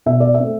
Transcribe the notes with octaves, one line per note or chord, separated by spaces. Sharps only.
B2 E5
D5
E5
A3 C4